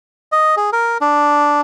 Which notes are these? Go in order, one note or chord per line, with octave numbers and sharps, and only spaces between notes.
D#5
G#4
A#4
D4